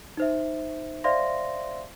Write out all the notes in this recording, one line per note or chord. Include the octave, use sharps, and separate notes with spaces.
D#4 C5 E5
C5 D5 E5 F5 C6 A#6